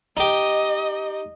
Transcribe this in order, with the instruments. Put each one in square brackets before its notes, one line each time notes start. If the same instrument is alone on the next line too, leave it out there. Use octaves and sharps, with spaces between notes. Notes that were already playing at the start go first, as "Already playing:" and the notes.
[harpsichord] D#4 G4 [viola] D#5